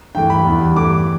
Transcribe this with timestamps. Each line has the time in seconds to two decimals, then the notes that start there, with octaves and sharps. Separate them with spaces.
0.15 G2 E3 A3 G5
0.30 B5
0.45 E2 E3 G3
0.76 G2 E3 A3 D6